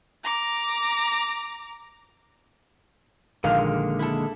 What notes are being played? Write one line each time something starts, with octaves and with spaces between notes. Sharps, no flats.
A#5 D6
A#1 A#2 D3 D#3 G#3 A#3 F5
E4 A4